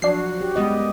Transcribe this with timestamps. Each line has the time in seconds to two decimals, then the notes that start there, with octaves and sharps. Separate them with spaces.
0.02 F3 F#3 D4 F#4 C7
0.41 G4
0.56 F#2 G3 G#3 B3 G4 D#5